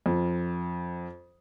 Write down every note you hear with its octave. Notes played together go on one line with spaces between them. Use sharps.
F2